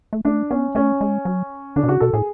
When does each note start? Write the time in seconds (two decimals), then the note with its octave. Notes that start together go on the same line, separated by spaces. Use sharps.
0.13 A3
0.25 A3 D4
0.51 B3 C#4
0.75 A3 C#4
1.01 G#3
1.25 F#3
1.76 D3 D4
1.83 B2
1.89 C#3 F#4
2.00 B2 A4
2.13 A2 G#4